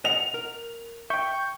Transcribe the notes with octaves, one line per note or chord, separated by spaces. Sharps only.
D#5 F#5 F7
A#4
E5 G5 C#6 G6